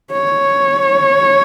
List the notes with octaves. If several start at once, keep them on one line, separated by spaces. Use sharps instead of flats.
C#5